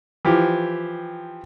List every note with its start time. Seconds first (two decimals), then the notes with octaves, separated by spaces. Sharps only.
0.25 E3 F3 G4